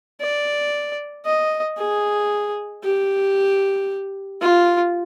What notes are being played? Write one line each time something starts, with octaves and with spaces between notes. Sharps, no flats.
D5
D#5
G#4
G4
F4